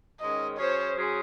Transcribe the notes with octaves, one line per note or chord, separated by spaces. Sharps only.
G#2 D#3 G#3 C#4 D#5
F#3 C#4 G#4 C5 C#5
F#3 C#4 G#4 C5